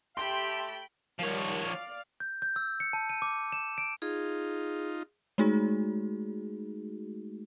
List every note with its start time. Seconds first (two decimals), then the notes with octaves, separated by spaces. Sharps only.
0.17 A3 G4 E5 G5 A5 B5 C6
1.19 D#3 F3 G3 C#5
1.65 D5 F5
2.20 G6
2.42 G6
2.56 E6
2.80 C#7
2.93 A5
3.09 D#7
3.22 D6
3.52 E7
3.78 D7
4.02 D#4 F4 G#4
5.38 G#3 A3 D#4 F#4 G#4